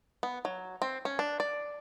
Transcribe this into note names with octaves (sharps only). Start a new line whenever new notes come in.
B3
F#3
C4
C#4
D4
D5